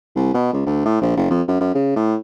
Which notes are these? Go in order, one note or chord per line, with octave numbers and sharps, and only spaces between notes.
C2
B2
C#2
D2
A2
A#1
F#1
F2
F#2
F#2
C#3
A2